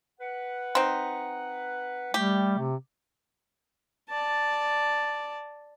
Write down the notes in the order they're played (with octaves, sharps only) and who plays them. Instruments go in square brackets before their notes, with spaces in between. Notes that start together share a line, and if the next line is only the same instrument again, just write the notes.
[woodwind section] B4 F#5
[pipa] C4 D#4
[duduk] G3 [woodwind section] A3 [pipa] G4
[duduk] C3
[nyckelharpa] D5 A5